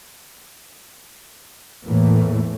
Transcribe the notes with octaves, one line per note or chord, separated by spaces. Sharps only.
E2 A2 E3 A3 A#3